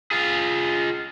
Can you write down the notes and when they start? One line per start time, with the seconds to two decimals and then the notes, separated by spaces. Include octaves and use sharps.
0.11 F4 G#4